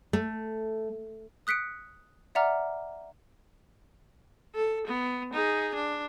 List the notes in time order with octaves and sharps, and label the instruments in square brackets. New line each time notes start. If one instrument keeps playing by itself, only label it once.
[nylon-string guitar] A3
[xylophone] D#6 F#6 B6 C#7 D7
D5 E5 F#5 A#5 D6 F6
[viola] A4
B3
D#4 G#4
D4